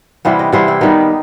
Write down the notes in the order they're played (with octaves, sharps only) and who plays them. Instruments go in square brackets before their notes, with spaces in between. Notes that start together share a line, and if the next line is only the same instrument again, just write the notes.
[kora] C3 E3 G3 B3 C5
D#5
C3 E3 G3 B3 C5
E4
D#3 G3 B3 D#4